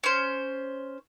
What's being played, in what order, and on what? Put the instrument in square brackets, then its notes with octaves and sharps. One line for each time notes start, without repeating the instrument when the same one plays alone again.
[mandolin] C#4 C5